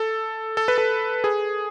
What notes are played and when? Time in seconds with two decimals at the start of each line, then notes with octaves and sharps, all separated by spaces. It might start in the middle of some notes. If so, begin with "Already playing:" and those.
Already playing: A4
0.57 A4
0.68 B4
0.78 A4
1.24 G#4